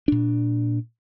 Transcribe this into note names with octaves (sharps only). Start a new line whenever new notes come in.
A#2 D4